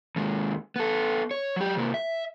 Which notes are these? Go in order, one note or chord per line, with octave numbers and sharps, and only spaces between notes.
D#2 G#3
B3 A4
C#5
F#3 G4
C3 A#3
E5